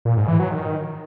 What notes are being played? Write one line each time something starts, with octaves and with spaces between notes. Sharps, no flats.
A#2
G#2
E3
F#3
D#3